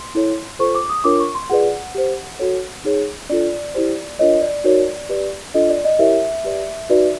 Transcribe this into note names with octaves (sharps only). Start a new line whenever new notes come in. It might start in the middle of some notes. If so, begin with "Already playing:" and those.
Already playing: C6
E4 A4 C#5
F4 A4 C5 C#6
D6
D#6
D4 F4 A#4 C#5 D6
C#6
C6
F4 G#4 B4 D5 F#5
G4 C5
F#4 A4 C#5
D#4 G#4 C#5
D4 F4 A4 D5
E4 G4 C5
D4 F4 A#4 C#5 D#5
D5
D#4 F#4 A#4 C#5
G4 B4 D5
D4 F4 A4 D#5
D5
D#5
E4 G4 A#4 C#5 E5
G4 B4 D5
D#4 F#4 B4 D5